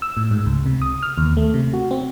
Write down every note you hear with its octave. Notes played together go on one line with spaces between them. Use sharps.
E6
A2
G#2
C#2
C3
D#6
F6
D#2
A3
C3
F#4
C4